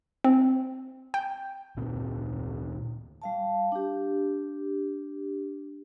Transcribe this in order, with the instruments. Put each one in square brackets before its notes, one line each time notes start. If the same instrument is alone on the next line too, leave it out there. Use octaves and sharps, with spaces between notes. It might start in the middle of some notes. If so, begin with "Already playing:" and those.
[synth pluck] C4
G5
[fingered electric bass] D2 A#2 C4
[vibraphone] G3 F5 A5
D4 G4